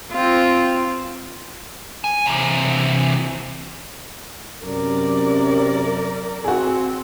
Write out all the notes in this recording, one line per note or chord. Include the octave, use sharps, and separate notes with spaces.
C4 F4
G#5
C3 E3
F#2 C3 A#4 D5
C4 F#4 G#4